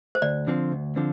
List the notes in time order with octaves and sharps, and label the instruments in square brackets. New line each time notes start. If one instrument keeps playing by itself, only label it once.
[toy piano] C5
[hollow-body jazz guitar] D2 [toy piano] D5
[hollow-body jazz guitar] D3 F3 C4
D2
D3 F3 C4